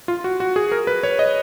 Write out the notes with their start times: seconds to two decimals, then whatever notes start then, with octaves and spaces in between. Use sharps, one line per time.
0.08 F4
0.24 F#4
0.40 F#4
0.56 G#4
0.72 A#4
0.87 B4
1.03 C#5
1.19 D#5